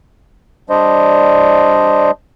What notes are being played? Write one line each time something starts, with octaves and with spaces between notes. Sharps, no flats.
G3 D4 C5 D#5